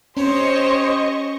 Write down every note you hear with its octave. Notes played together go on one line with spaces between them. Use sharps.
C#4 G4 C5 C#5 D#5 C#6